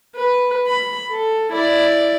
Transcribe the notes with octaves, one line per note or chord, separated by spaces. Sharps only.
B4
B5
A4
E4 D5